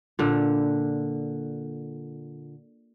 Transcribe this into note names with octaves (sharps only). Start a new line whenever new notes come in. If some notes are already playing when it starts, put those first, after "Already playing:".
A#2 D3